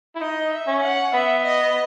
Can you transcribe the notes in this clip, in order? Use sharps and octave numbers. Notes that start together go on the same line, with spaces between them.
E4
D#4 D#5
E5
C#4
F#5
B3 E5
D#5